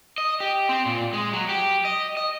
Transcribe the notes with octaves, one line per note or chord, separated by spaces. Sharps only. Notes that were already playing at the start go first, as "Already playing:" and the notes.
D#5
G4
C4
A#2
G#3
F#3
G4
D#5
D#5